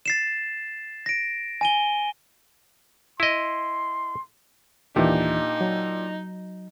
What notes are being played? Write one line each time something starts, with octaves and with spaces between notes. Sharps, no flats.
A6 C7 E7
A#6 D7
G#5 D#7 G7
E4 D#5 C6
D#2 A#2 E3 D4 D#4 G4
F#3